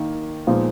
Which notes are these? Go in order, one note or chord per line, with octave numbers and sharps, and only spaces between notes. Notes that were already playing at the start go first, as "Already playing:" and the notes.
Already playing: D#3 A#3 D#4
A#2 F3 G#3 B3 D#4